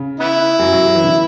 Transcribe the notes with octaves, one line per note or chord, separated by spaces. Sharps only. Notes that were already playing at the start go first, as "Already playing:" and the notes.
Already playing: C#3
B3 E4
F#2 F#3
F#2 F#3
F#3
E3
D3